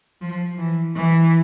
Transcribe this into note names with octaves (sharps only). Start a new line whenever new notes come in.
F3
E3
E3